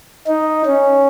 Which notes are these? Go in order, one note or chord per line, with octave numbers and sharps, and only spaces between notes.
D#4
C#4